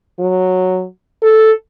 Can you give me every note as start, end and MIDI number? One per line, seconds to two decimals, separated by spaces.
0.19 0.84 54
1.23 1.52 69